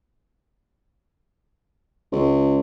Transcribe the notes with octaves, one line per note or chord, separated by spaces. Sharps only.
C#2